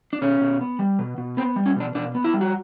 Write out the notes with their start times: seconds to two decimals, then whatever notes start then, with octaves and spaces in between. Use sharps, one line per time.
0.13 D4
0.22 B2 C#4
0.41 B2
0.61 B3
0.79 G3
0.99 B2
1.18 B2
1.37 B3 C4
1.56 G3
1.66 C#4
1.76 B2 D4
1.95 B2 D4
2.15 B3
2.24 E4
2.34 G3
2.41 F#4